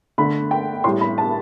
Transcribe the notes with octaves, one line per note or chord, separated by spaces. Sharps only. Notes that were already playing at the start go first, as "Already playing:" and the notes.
D3 A3 B5
G5
A2 G3 C6
B5
A5